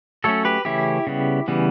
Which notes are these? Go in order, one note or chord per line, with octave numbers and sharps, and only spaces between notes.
F#3 A3 C#4 A4 C#5
G4 B4
C#3 E3 A3 C#4 E4 G4
C#3 G3 B3
C#3 E3 G3 B3